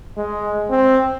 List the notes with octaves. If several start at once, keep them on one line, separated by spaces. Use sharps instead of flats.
G#3
C4